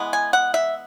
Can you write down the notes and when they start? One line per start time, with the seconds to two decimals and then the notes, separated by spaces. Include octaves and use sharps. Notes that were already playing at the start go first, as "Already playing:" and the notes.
Already playing: E3 G#3 B3
0.13 G#5
0.33 F#5
0.54 E5